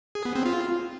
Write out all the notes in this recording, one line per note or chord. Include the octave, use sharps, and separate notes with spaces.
G#4
B3
C4
F4